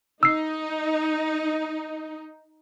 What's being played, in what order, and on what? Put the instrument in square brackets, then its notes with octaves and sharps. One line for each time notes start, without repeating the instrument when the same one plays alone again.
[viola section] D#4 [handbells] E6 C7